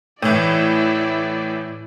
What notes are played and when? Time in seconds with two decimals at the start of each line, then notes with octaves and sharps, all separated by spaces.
0.22 A2 E3 E4 D5